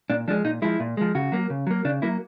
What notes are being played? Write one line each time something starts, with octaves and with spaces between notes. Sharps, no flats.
A#2 D4
F3 G#3 D4
A#2 D#4
F3 G#3 E4
A#2
F3 G#3
C#3 F#4
F#3 A#3
C#3
F#3 A#3
C#3 D4
F#3 A#3 E4